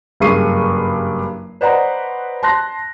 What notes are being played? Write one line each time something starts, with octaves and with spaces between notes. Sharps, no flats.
F#1 G2 G#4 C#6 C7 D#7
B4 C5 D5 D#5 F#5 A#5
A5 C6 F#6 A#6